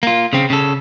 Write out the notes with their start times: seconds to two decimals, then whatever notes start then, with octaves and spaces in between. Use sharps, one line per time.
0.03 A#3 F4
0.33 C#3 C4
0.50 C#3 A4